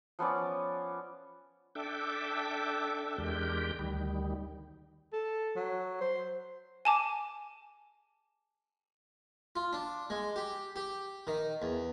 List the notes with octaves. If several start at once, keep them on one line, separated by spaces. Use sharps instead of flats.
F3 B3 C#4 D5
D4 A4 E5 G5 D6
E2 G#3 D4 G4 A#4 G6
D2 D#3 G3
A4
F#3
C5
G#5 A5 D6
F4
D4
G#3
G4
G4
D#3
E2